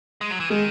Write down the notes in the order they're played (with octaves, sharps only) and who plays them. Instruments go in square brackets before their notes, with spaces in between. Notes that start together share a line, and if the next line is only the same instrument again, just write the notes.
[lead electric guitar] G#3
F#3
E3
[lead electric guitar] D#3 [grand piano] G#3